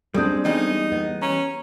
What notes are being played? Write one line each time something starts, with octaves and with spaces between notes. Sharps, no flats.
G3 G#3 C4 D4 A4 D#6 G6
E2 G3 D#4
B3 D#5
C#4 A#5